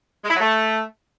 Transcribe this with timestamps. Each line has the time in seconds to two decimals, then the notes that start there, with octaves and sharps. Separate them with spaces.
0.25 G#3
0.30 E4
0.35 F#3
0.41 A3